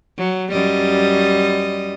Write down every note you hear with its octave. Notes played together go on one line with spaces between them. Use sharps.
F#3
F#2 G3 D#5